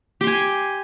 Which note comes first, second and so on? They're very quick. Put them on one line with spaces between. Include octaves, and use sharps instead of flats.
G4 C6 G#5